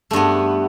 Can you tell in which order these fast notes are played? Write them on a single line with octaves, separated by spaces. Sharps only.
A3 G2 B3